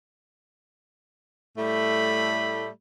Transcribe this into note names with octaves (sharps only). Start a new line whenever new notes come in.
A2 G3 A3 B5